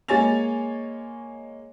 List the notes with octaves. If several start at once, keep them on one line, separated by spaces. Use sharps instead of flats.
G#3 A#3 C#5 G#5 A6 F7